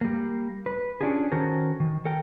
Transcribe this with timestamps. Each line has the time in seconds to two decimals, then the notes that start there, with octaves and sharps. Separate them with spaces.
0.01 G3 A#3
0.66 B4
1.01 C#4 D4 F4 G4 G#4
1.32 D#3 C#4 F#4 A4 A#4 C5
1.80 D#3
2.05 A4 A#4 G5